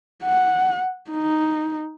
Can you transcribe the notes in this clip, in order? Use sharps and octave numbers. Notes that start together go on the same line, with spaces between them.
F#5
D#4